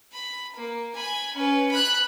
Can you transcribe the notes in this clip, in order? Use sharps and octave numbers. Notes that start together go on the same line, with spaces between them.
B5
A#3
G#5 B5
C#4 B4
B5 F#6